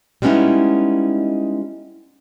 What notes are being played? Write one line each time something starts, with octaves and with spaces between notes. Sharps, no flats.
G3 G#3 B3 C#4 D#4 E4